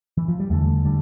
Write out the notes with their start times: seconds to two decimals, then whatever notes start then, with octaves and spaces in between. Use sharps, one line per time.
0.17 E3
0.28 F3
0.40 G3
0.50 E2 D3 A3
0.85 D3 G3